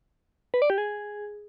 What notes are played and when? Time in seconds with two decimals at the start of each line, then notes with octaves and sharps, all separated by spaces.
0.54 B4
0.62 D5
0.70 G4
0.78 G#4